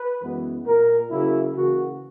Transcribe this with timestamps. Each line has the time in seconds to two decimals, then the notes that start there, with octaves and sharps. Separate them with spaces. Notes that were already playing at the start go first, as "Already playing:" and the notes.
Already playing: B4
0.21 F#2 E3 G#3 B3
0.66 A#2 A#3 A#4
1.11 C#3 F#3 A#3 E4
1.56 C#3 E3 A#3 F#4